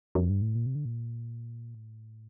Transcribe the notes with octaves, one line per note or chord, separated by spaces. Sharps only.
F2
G2
A2
A#2
C3
D3
A#2
A2